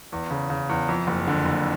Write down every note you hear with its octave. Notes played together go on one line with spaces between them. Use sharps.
E2
C#3
C#3
E2
F2
F#1
D3
F#1